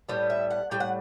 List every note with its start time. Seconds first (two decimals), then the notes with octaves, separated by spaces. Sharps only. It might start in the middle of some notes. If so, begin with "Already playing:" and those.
0.09 A2 G3 B3
0.30 E5
0.51 F#5
0.71 A2 G3 G5
0.80 F#5